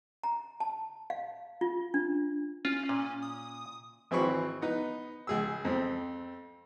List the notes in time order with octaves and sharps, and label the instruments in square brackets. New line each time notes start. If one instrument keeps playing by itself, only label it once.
[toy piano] A#5
A5
F5
F4
D4
[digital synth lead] C#4 [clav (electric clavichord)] F4
[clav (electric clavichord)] A#2
[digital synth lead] D#6
[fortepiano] G#1 E3 C4 G#4 B5 C#6
B3 D#4 B4
C#2 G#4 E6
F2 C4